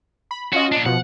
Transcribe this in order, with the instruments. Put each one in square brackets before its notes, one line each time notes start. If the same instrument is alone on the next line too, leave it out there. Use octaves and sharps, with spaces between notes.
[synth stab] B5
[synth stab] C#4 F4 D#5 [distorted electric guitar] F#4
[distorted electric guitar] A#2 D4
[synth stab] B2 F3 [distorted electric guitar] F#5